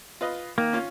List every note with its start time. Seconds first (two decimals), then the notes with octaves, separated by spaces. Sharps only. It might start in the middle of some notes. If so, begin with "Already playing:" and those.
0.21 F4 B4 D#5
0.58 D#3 A#3
0.73 C#4 F4